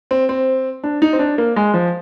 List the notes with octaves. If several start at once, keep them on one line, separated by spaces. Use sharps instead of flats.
C4
C4
D4
D#4
C4
D4
A#3
G#3
F3